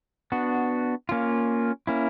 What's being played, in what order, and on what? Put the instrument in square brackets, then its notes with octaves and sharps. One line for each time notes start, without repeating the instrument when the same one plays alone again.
[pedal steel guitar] B3 D4 F#4
A#3 C#4 F4
A#3 C#4 E4